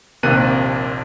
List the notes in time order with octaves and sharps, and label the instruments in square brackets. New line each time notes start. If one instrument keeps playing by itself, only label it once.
[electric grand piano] A#1 D#2 C3 A#3 F#6 D#7